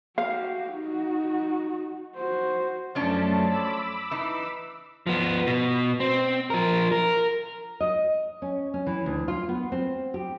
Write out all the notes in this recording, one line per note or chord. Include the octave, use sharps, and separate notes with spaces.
F#4 G4 F5
D#4 F#4
F#4 C5
F#2 F3 A3 C#4 D4 A5
B5 D6 E6
E3 D#4
F3 B3
B2
C4
F3 A#4
A#4
D#5
C#4
C#4
E3
D2
F4
B3
C4
G4